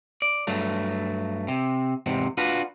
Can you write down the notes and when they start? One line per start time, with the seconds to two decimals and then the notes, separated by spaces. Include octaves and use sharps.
0.22 D5
0.47 G2 F#3 A3
1.48 C3
2.06 E2 G#2 C3
2.38 D4 F4 F#4 B4